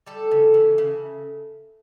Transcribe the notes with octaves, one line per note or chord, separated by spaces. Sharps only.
G3 A4
C#3
E3
C#3